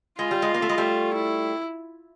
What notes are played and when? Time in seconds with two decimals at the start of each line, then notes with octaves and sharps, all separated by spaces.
0.19 G#3 F4
0.31 G3
0.42 G#3
0.54 A#3
0.62 A3
0.69 G#3
0.78 G3 A3
1.14 E4